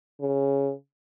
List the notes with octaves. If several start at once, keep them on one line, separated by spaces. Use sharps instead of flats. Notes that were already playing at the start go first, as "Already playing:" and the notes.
C#3